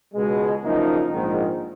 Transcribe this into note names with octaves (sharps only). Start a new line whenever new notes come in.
C#2 B2 G#3
F#1 F#2 F3 A#3 D#4
A#1 G#2 D#3